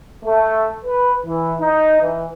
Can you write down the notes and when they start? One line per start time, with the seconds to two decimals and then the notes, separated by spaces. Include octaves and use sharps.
0.25 A3
0.85 B4
1.25 E3
1.60 D#4
2.01 E3